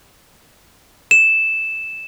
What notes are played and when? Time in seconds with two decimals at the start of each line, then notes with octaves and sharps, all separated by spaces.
1.11 E7